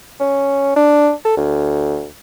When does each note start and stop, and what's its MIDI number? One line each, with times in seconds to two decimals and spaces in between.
0.20 0.72 61
0.76 1.12 62
1.25 1.33 69
1.37 2.07 38